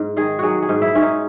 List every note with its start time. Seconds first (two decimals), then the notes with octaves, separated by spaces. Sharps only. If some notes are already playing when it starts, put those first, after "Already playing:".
Already playing: G#2
0.17 D#3 G#4
0.39 F#3 F#4 G#4
0.62 G#4
0.69 G#2
0.82 E4
0.95 G#2 C#4
1.02 D#4